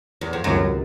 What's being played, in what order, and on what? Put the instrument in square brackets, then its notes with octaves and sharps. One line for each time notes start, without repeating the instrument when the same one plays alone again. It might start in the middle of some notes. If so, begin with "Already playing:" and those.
[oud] E2
F2
[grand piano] C#2 C3 D#3 F#3 [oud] F#2